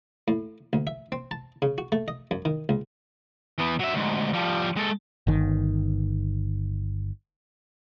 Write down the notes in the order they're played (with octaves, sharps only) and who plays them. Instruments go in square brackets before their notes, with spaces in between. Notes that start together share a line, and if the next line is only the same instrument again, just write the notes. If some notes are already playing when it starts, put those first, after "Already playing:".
[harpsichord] A2
D2
E5
C4
A5
C#3
F#4
A3
D#5
F#2
D#3
C#2
[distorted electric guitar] E3 B3
F#3 E5
D2 G#2
F3 G3
G#3 A4
[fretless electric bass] G1 D#3